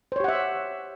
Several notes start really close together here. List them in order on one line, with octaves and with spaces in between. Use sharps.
C5 C#5 G4 F#5 E5